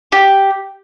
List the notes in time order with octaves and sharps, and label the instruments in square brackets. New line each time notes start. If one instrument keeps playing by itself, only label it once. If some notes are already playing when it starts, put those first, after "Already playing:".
[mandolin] G4